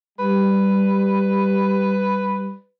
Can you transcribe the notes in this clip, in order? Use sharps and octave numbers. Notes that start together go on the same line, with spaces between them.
G3 B4